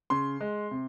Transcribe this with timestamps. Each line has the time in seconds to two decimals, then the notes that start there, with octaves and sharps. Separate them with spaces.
0.10 C#3 C6
0.41 G#3
0.71 C3